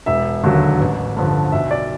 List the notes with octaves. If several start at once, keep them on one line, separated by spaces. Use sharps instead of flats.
E1 E5
D#2 D3 F#3
A1
G2 D3 F3
B1 E5
D5